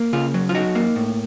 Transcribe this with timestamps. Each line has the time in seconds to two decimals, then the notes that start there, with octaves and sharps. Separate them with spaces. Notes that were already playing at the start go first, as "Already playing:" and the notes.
Already playing: A#3
0.13 C#3 F4
0.34 F#3
0.49 F4
0.55 D#4 F#4
0.75 A#3
0.96 A2